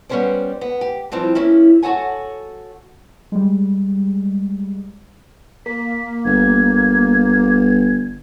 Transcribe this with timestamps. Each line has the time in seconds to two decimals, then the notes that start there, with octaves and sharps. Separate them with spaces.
0.09 G3 B3 C#4 G#4 C5 D5
0.61 B3
0.81 G4
1.12 E3 F3 G3 C4
1.35 A#3 C#4 E4
1.83 F#4 G4 A4 C#5 F#5 G#5
3.32 G3 G#3
5.66 A#3 B6
6.25 G1 G#6